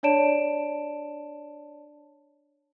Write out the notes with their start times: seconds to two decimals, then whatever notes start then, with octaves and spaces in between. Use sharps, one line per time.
0.03 D4 C#5 D5 A5 D7 E7